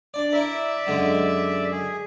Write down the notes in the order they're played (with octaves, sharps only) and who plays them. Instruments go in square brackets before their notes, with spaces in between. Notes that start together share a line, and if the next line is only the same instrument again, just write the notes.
[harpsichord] D4 D5
[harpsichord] E4 A#4 [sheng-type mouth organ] D5 E5
[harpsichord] F#2 D3 G#3
[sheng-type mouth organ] G#4